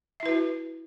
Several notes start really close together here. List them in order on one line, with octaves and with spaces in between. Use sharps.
E5 E4 B4 F#4